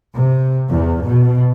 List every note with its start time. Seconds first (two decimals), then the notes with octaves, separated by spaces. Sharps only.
0.14 C3
0.71 E2
1.04 B2